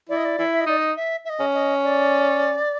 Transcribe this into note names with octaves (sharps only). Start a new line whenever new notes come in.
E4 D5
D#5
D5
E4
E5
D#5
D#4 D5
D#5
E5
E5
D#5
C#4
D#5
D5